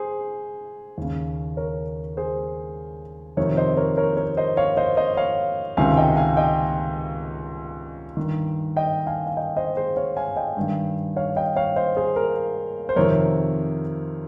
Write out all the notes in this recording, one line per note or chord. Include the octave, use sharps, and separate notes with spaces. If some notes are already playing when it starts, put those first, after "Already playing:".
Already playing: G#4 C5
D#2 C#3
A#4 C#5
G#4 C5
F2 C3 D#3 A#4 C#5
C5 D#5
A#4 C#5
A#4 C#5
A#4 C#5
C5 D#5
C#5 F5
C5 D#5
C5 D#5
C#5 F5
C#2 C3 D#3 F5 G#5
D#5 G5
F5 G#5
D#5 G5
G2 D#3
D#5 G5
F5 G#5
F5
D#5 G5
C5 D#5
G#4 C5
C#5 F5
F5 G#5
D#5 G5
G2 D#3
C#5 F5
D#5 G5
C#5 F5
C5 D#5
G#4 C5
A#4
C5
F2 C3 D#3 A#4 C#5